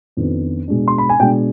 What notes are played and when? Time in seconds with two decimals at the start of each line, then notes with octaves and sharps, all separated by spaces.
0.17 F2 D#3 B3 D4
0.68 B2 G#3 D4
0.88 C6
0.98 B5
1.09 G#5
1.20 B2 G#3 D4 G5